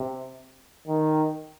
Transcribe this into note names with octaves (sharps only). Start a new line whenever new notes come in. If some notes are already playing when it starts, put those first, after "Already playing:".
Already playing: C3
D#3